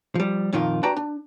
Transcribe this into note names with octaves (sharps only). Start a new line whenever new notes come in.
F3 G3
F2 A#2 D#3 A#3 F4
D4 F#4 B4 D5 G5 A#5
D4